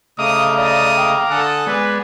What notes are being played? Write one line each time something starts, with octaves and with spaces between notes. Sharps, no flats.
C#3 A3 D#5 F5 A#5 D6 D#6
D5 D#6
G5
D3 A4 G#5 D#6 F#6
G#3 B3 B4 D5